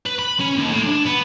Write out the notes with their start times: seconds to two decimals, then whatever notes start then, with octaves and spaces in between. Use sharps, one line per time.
0.06 B4
0.19 B5
0.39 C#4
0.56 D#2
0.70 A2
0.84 D4
1.05 B3